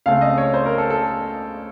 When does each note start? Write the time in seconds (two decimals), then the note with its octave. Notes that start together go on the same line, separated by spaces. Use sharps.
0.06 C#2 C#3 A3 C4 F5
0.21 D#5
0.38 C#5
0.54 C5
0.66 A#4
0.78 A4
0.90 A4